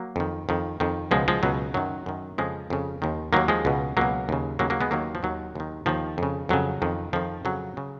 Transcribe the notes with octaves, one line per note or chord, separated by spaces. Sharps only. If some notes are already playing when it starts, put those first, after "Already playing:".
Already playing: F#3 A#3
F2 D#3
F2 D#3
F2 D#3
C#2 B2 F3 G#3
F3 G#3
C#2 B2 F#3
F#2 D#3 F#3
F#2 D#3
F2 C#3 F3 G#3
F2 C#3
D#2 D#3
D#2 D#3 F#3 A#3
F3 G#3
C#2 B2
C#2 B2 F#3 A#3
D#2 C#3
D#2 C#3 F#3 A#3
F#3 A#3
G#3 B3
D#2 D#3 F#3 A#3
F3
D#2 D#3 F#3
D#2 D#3
D#2 D#3 F3
F2 C#3
F2 C#3 F#3
F2 D#3
F2 D#3 F3
F2 C#3 F#3
C#3